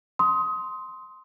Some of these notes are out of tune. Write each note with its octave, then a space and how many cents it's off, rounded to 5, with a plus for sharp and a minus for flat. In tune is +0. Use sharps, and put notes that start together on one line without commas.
C6 +0 D#6 +25